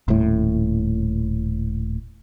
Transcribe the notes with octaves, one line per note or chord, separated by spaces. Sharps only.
D#1 A2